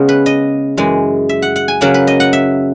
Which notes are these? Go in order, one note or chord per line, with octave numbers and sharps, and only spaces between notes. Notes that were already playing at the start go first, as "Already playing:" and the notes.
Already playing: C#3 G#3 B3 G#4
B4
D#5
F#2 E3 G#3
E5
F#5
F#5
G#5
C#3 F#3 A#3 F#5
B4
D#5
F#5
E5